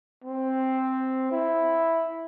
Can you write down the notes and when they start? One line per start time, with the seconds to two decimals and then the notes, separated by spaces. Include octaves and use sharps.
0.24 C4
1.31 E4